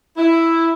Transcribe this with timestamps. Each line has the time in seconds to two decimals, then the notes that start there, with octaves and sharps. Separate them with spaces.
0.17 E4